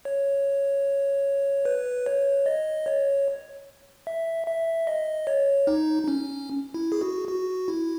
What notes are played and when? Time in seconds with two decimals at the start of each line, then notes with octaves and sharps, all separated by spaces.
0.05 C#5
1.65 B4
2.06 C#5
2.46 D#5
2.86 C#5
4.07 E5
4.47 E5
4.87 D#5
5.27 C#5
5.67 D#4
6.03 D#4
6.08 C#4
6.74 E4
6.92 G#4
7.01 F#4
7.28 F#4
7.68 E4